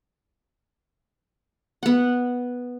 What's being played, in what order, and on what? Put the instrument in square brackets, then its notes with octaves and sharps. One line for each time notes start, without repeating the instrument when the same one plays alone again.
[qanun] B3 F#5